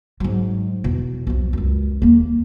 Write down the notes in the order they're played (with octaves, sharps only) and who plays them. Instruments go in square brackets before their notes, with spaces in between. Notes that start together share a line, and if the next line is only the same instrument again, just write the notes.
[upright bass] G#2 F#3
E2 B2
B1 F3
C#2 F#2
D#2 A#3